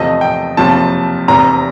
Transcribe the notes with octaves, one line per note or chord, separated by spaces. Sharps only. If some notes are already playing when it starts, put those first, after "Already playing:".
Already playing: E2 C3 F3 A3 D#5
G5
F#1 F2 C3 F3 A5
F1 E2 C3 A#5